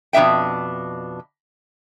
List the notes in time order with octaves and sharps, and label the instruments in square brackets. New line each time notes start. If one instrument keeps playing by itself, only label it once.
[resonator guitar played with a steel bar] F2 B2 D4 E5 G5